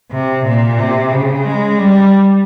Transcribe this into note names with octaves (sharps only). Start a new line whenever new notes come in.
C3
A#2
C3
C#3
G#3
G3